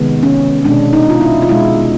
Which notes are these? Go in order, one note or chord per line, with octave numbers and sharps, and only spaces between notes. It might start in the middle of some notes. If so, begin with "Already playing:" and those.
Already playing: C3 D#3 G#3 B3
C#4
B2 G#3 D4
D#4
F4
E4
F4
B2 G#3 E4